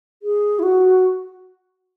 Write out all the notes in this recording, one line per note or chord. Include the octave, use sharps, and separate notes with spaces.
G#4
E4
F#4